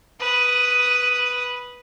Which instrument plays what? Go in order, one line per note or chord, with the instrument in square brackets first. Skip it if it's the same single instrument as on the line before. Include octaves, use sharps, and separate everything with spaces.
[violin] B4 D#6